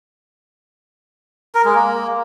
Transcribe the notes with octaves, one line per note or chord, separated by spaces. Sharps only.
A#4
G#3
A#3